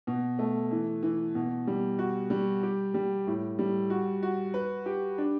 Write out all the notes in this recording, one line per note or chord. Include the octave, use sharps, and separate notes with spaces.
B2
A3
E3
E3
B2
G3
F#4
G3
G4
G3
A2
G3
F#4
F#4
B4
G4
D4